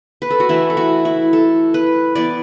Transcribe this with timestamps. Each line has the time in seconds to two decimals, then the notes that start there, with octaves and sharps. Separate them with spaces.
0.22 B4
0.30 A4
0.40 F#4
0.49 E3 A3 E4
0.70 A4
0.77 F#4
1.05 E4
1.33 A4
1.74 B4
2.15 E3 B3 D5